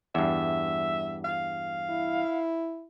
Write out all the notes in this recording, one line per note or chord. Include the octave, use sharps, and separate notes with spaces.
E2 G2 E5
F5
E4